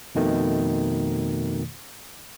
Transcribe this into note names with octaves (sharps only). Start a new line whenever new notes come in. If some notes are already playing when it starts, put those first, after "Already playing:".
F2 B2 D#3 A3